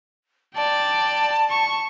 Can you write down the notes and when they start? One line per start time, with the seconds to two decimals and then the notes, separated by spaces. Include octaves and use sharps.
0.55 D5 G5 A5
1.50 C#6